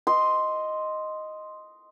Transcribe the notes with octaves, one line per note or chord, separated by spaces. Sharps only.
D#5 C6